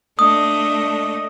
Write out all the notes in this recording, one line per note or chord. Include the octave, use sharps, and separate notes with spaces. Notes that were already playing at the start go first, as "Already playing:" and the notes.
A3 D4 D#5 D#6